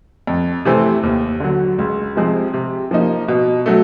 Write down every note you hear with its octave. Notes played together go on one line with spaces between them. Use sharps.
F2
C3 E3 A3 C4
D#2
D3 F#3
C#2
C3 F3 G#3 C4
C3
F3 A#3 D#4
B2
F#3 A3